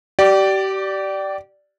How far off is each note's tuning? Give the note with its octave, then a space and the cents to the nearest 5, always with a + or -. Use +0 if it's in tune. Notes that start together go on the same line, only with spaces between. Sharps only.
G4 -30 D5 +0